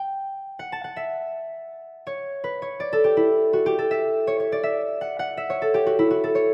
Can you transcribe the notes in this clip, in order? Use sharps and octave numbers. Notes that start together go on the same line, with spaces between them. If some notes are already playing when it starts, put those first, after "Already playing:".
Already playing: G5
F#5
A5
F#5
E5
C#5
B4
C#5
D5
A4
G4
E4
F#4
G4
A4
E5
C#5
C#5
D5
E5
F#5
F#5
E5
C#5
A4
G4
F#4
E4
F#4
A4
C#5